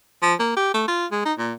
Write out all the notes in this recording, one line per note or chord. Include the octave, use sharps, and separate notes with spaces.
F3
A#3
G4
A3
F4
G#3
D#4
A#2